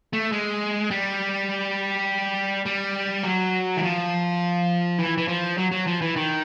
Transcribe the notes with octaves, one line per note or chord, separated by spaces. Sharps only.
A3
G#3
G3
G3
F#3
E3
F3
E3
E3
F3
F#3
F#3
F3
E3
D#3